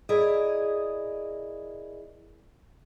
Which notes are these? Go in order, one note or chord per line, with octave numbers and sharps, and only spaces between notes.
E4 G#4 A#4 D5 D#5